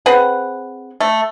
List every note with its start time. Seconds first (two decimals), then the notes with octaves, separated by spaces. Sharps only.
0.06 C4 G#4 B4 F#5
1.00 A3